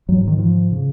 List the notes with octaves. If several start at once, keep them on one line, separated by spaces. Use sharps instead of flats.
G#2 F#3
D#3
F3
C#3